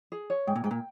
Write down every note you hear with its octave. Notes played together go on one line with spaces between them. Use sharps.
G#4
C#5
G#2 G5
A#2
G#2 G5
A#2